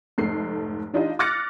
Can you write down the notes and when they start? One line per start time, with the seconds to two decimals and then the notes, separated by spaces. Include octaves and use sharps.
0.18 F1 G#2 A3 C7
0.94 E3 D4 D#4 F4 G4 D#5
1.19 D6 F6 F#6 A6 A#6 C#7